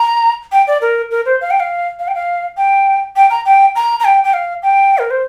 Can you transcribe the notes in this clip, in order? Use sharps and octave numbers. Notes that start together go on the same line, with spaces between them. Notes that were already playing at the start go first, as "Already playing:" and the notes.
Already playing: A#5
G5
D5
A#4
A#4
C5
F5
G5
F5
F5
G5
F5
G5
G5
A#5
G5
A#5
A#5
G5
G5
F5
G5
A#4
C5